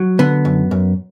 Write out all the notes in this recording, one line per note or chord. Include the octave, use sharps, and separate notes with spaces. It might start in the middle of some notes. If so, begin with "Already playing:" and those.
Already playing: F#3
D3 B3
F#2
F#2